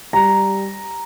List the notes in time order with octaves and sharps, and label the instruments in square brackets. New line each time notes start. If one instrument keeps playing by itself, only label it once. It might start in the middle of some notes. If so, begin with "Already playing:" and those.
[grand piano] G3 A#5